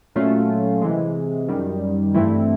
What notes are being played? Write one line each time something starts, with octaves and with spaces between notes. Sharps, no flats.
A#2 F#3 A3 C#4 F4
C3 E3 G#3
F#2 D#3 G3
G2 E3 A3 C4 E4